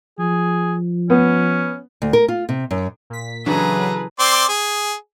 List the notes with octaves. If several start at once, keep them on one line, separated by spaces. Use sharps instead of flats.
F3 G#4
B3 C#4
D2
A#4
F4
C3
F#2
A#2 B6
C#3 E3 F#3 D4 G#4 A4 B4 A#5
C4 D5 C6
G#4